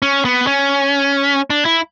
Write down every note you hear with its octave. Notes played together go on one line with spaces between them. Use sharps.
C#4
B3
C#4
D4
E4